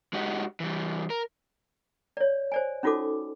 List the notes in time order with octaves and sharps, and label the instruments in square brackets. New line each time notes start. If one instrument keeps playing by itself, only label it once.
[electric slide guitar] G#3 D#4 F#4 G4
E3 G3
A#4
[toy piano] C#5 D5
C5 D5 G#5
C#4 D#4 F4 F#4 A4 D6